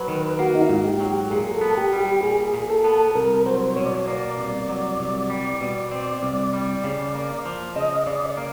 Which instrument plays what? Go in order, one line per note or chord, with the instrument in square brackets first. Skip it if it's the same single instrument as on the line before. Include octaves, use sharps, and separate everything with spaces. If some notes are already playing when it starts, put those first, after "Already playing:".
Already playing: [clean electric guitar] F#3 [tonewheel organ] B4
[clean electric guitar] D#3
[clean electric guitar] A#3 [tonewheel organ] F#4
[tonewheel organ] D#4
E4
[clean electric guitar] G#2 [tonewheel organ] F4
[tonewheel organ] F#4
G4
[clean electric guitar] F#3
[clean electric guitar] A#2 [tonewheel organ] G#4
[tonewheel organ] A4
[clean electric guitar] B3
[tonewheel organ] G4
[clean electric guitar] G3
[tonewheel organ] G4
[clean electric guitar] A#2 [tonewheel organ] G#4
[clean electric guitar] A#2
[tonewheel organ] A4
[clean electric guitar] B3
[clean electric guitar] C2 [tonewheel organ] A#4
[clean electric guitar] F#3 [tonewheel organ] C5
[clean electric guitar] B2 [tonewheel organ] C#5
[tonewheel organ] D5
C#5
[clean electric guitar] A#3 [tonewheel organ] D5
[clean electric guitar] C2
F#3
C2
G3
B2
C4
C2
G3
C#3
A#3
F3
[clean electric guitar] C#3 [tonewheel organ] D#5
[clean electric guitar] C#3 [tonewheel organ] D5
[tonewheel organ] D5
[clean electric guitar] A#3